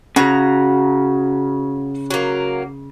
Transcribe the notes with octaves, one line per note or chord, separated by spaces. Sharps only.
C#3 F#4 A#5
F#3 A#3